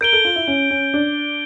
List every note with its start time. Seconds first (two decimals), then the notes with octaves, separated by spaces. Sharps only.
0.01 A#4 G6 D7 G7
0.13 A4
0.25 F4
0.36 E4
0.48 C#4
0.71 C#4
0.94 D4